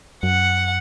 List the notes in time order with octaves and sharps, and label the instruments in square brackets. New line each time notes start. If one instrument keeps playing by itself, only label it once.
[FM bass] F#2 [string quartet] F#5